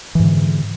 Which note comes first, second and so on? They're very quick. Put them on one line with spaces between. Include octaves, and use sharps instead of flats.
E3 G#2 D3